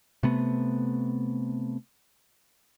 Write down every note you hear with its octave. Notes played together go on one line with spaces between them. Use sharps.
C3 A3 B3